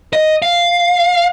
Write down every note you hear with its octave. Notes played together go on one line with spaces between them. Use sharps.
D#5
F5